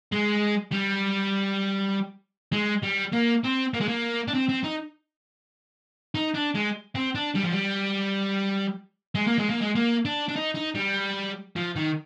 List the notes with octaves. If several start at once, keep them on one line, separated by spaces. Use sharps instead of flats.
G#3
G3
G#3
G3
A#3
C4
A#3
G#3
A#3
D4
C4
C4
D#4
D#4
D4
G#3
C4
D4
G3
F3
G3
G#3
A#3
G#3
A#3
G#3
A#3
D4
D4
D#4
D#4
G3
F3
D#3